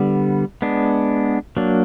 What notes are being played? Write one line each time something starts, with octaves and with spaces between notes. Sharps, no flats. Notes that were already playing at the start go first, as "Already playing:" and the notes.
Already playing: D3 G3 B3
G#3 B3 D4
F#3 A#3 D4